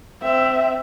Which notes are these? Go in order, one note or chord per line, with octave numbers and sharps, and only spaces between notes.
C4 E5